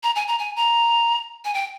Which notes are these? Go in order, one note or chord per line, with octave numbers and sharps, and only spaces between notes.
A#5
G#5
A#5
G#5
A#5
G#5
G5